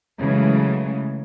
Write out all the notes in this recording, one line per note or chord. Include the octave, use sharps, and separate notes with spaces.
C#3 E3 F#3 G#3 A3